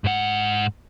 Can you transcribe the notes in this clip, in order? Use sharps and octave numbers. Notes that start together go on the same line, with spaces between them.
G#2 F#5